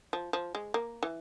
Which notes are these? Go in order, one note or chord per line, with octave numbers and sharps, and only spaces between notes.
F3
F3
G#3
A#3
E3